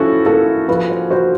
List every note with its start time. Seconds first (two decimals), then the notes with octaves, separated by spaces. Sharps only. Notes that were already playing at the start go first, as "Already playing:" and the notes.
Already playing: F3 C#4 E4 F#4 A4
0.26 A#3 A4
0.68 F3 B4
0.90 C5
1.10 F#4 C5